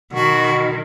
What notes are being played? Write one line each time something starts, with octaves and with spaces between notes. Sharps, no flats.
B2 D#3 F#4